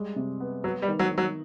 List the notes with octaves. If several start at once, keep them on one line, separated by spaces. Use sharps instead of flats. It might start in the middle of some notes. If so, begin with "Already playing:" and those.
Already playing: G3 G#3
C3
B3
F#3 B3
G3
D#3
F#3
D#3
F#3